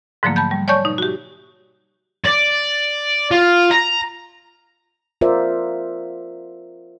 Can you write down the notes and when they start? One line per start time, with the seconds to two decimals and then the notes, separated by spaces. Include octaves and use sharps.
0.23 G#2 D3 F3 F#3 A3 A#3
0.36 A5 B5 G6
0.51 G3
0.68 C#5 D5 G#5 A5 C#6 G6
0.85 B2 D#4
0.98 F#4 G4
2.25 D5
3.31 F4
3.71 A#5
5.21 F4 A#4 C5 D5 E5